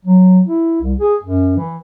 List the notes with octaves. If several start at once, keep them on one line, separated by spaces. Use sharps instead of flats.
F#3
E4
C2
G#4
F#2
E3